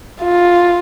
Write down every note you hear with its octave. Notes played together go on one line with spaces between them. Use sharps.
F4